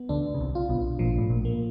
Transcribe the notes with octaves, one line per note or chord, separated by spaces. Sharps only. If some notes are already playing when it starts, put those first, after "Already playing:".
Already playing: B3
D2 D3 D4
C#3
C2 C3
F4
B1 B2
A#1 A#2 F3
A2
A#1 A#2
A#3